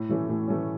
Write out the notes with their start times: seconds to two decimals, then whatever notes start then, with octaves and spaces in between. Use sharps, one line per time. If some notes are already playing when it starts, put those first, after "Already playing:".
Already playing: A2
0.09 E3 A3 C#4
0.29 A2
0.48 E3 A3 C#4